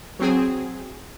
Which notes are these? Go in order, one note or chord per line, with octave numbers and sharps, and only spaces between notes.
F#3 C4 G#4